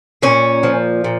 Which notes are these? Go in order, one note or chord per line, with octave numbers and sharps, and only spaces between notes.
A#2 C#4
F3
A#2